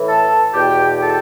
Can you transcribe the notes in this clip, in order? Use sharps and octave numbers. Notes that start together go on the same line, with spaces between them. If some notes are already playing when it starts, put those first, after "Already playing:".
Already playing: A2 E3
A4 A5
E2 B2 G4 G5
A4 A5